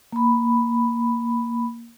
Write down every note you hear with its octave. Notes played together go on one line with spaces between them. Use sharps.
A#3 B5